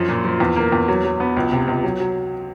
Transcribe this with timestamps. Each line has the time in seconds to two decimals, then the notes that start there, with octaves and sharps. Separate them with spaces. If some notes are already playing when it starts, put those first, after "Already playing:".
Already playing: F#2 F3
0.09 A#2
0.25 F3
0.40 E2
0.56 A#3
0.72 E2
0.88 F#3
1.05 F#3
1.20 B3
1.37 C#2
1.52 C3
1.68 C#2
1.83 F#3
2.00 F#3